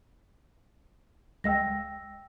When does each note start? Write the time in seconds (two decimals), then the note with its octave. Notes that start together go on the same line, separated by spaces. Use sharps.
1.44 C#2 G#3 F5 G5 E6 A#6